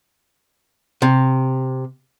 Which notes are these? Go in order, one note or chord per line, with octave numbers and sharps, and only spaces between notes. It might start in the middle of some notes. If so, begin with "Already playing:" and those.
C3